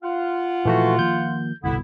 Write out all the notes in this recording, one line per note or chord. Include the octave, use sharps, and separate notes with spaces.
F4 F#5
A#2 E3 F3 A3 F#4
D#3 F3 A#3 G6
G1 C2 B2 D3 B3 E4